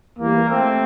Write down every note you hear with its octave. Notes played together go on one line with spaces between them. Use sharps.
E2 E3 G3 A#3
A3 C4